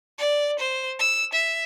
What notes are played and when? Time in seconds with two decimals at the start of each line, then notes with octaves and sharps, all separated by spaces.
0.18 D5
0.59 C5
0.99 E6
1.33 E5